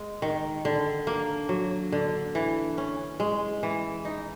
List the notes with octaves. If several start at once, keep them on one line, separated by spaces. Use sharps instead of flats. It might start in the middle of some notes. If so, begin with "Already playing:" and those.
Already playing: G#3
D#3
D3
A#3
F#3
D3
E3
C#4
G#3
E3
D#4